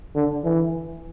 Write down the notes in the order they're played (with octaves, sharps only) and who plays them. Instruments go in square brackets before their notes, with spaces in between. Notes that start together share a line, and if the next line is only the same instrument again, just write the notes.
[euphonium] D3
E3